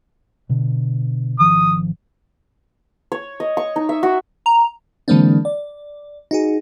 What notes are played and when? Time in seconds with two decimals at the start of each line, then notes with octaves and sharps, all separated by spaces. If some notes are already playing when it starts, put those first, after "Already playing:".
0.49 B2 D3
1.39 G#1 D#3 F3 D#6
3.12 C#5
3.40 D#5
3.57 C#6
3.76 D#4
3.89 E5
4.03 F#4
4.46 A#5
5.08 D3 E3 G#3 A#3 C4 D4
5.45 D5
6.31 D#4 F#4 G#4